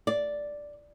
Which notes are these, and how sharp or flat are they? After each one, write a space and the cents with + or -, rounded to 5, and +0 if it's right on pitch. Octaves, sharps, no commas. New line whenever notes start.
D5 -5